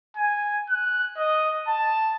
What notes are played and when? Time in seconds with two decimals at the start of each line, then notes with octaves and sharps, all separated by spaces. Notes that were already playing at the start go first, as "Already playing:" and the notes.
0.16 G#5
0.70 F#6
1.17 D#5
1.68 A5